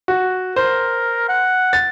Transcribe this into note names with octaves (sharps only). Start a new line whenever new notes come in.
F#4
A#4 C5
F#5
A6